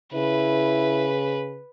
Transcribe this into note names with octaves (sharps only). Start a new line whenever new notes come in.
C#3 E4 B4